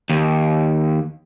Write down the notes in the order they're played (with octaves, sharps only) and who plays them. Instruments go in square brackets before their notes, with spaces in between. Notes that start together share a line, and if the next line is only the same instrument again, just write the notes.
[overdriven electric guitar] D#2